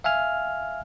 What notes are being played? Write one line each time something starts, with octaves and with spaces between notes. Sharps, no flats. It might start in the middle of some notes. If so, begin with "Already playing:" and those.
E5 F5 G#5 F6